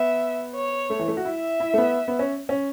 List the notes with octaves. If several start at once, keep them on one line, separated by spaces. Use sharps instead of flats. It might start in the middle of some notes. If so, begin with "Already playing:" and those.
Already playing: B3 E5
C#5
A3
E3
A3
F#4
E4 E5
E4
A3
B3
B3
C#4
C#4